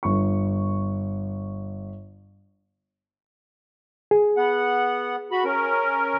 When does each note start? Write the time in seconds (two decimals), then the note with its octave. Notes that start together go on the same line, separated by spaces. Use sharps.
0.03 G1 C#6
4.11 G#4
4.37 B3 F#5
5.31 F#4 B5
5.44 C#4 A#4